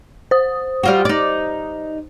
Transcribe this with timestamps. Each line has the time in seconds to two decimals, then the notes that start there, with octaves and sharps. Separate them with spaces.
0.31 C5 D#6
0.83 G3 F4 F#4
1.05 D#4 D5